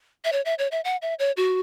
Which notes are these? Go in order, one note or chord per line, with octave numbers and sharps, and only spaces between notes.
E5
C#5
E5
C#5
E5
F#5
E5
C#5
F#4